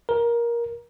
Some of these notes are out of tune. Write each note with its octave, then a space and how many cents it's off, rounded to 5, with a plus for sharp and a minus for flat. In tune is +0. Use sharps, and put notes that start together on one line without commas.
A#4 +15